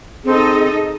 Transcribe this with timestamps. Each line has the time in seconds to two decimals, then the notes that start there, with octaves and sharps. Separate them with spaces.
0.25 C4 D#4 G#4 A4 D#5